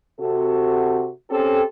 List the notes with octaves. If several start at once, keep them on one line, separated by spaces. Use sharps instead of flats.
C3 F#4 A4
C4 C#4 G4 A4